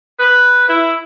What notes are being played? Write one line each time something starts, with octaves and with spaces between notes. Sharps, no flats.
B4
E4